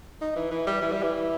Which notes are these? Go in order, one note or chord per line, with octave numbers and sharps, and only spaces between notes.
D#4
E3
E3
G3
E3
G3
E3